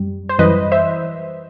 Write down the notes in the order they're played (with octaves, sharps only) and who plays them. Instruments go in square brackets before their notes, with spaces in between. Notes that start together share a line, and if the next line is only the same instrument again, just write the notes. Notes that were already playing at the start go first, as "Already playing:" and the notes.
Already playing: [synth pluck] F#2 G3
C5
F#2 E3 G3 B4 D#5
C5 E5